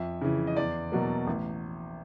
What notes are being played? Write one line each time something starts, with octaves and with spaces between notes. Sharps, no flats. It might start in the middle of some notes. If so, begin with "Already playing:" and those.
Already playing: F2 E5
C#3 E3
D#5
E2 D5
B2 F#3 A#3
A1